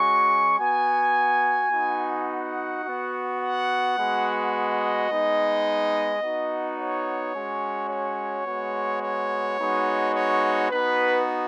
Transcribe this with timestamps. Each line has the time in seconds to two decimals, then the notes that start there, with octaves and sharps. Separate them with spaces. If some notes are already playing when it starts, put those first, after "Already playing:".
Already playing: G#3 C#4 F#4 C#6
0.59 B3 F#4 G#5
1.71 B3 D#4 F#4
2.28 F#5
2.84 B3 F#4
3.40 F#5
3.96 G#3 B3 F#4
4.53 D#5
5.09 G#3 B3 D#4
6.21 B3 D#4 F#4
6.78 C#5
7.34 G#3 C#4 F#4
7.90 C#5
8.46 G#3 B3 F#4
9.02 C#5
9.59 G#3 B3 D#4 F#4
10.15 C#5
10.70 B3 D#4 F#4 B4